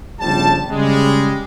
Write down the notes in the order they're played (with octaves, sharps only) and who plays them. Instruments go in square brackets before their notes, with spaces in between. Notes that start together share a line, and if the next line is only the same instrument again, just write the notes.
[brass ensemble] G1 C#3 F3 G3 A5
C#3 G3 G#3